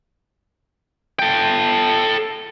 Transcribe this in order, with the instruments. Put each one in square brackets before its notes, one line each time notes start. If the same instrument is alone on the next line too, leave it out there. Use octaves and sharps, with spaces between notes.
[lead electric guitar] A4 G5